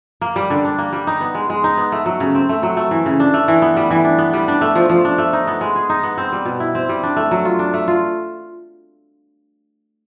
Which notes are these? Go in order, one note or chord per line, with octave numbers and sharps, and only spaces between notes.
A#3
G3
D3
D4
A#3
G3
D#4
B3
G#3
G#3
D#4
B3
A3
F#3
C#3
C4
A3
F#3
A3
E3
C#3
D4
A3
E3
B3
G3
E3
D4
B3
G3
D4
A3
F3
F3
D4
A3
D#4
B3
G#3
G#4
D#4
B3
C4
G3
B2
E4
C4
G3
D4
A3
F#3
F4
D4
A3
F4